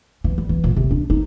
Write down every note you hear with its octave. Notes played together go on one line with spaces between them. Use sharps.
E3
G3
E3
A#2
C3
D4
D#4